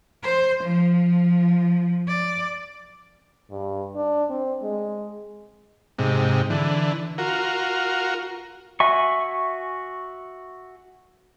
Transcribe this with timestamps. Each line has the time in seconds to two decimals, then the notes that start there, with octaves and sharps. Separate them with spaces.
0.23 C5
0.64 F3
2.08 D5
3.51 G2
3.95 D4
4.30 C4
4.62 G#3
5.98 G#2 C3
6.50 D3 E3
7.18 F4 F#4 A#4
8.80 F#4 E5 G#5 C#6